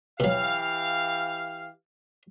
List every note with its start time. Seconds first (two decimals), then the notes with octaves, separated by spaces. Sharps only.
0.20 B2 E3 F#3 G4 F5